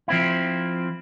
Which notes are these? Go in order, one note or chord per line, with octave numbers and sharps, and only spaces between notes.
F3 C4 E4